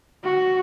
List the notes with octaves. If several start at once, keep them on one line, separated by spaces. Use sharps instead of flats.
F#4